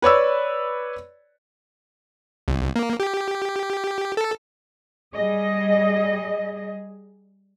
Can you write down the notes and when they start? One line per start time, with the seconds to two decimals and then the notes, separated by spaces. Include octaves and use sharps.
0.02 B4 C#5 D5 E6
2.48 C2
2.76 A#3
3.00 G4
4.17 A4
5.14 G3 G#4 D#5